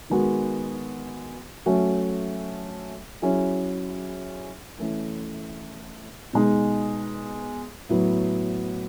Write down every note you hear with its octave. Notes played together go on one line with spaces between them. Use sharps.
D#3 G#3 B3 F#4
F#3 A3 C#4 F#4
F#3 C#4 E4 G#4
E3 A3 C#4 E4
B2 G#3 D#4 G#4
A2 F#3 B3